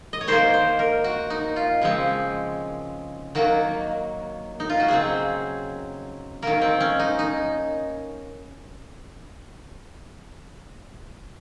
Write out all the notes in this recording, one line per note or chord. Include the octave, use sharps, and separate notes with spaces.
D#5
C#5
D#3 A#3 C5
C5
A#4
F#4
D#4
F4
C#3 F3 G#3 C4
D#3 F#3 A#3 F#4
D#4
F4
F#4
C#3 F#3 C4 G#4
D#3 F#3 A#3 A#4
C4
C#4
D#4
D#4